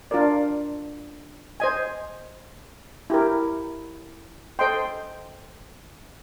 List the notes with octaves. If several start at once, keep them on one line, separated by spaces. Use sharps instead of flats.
D4 F4 A#4 D5
C5 D#5 G#5
E4 G4 A#4
A4 C5 D#5 G5 C6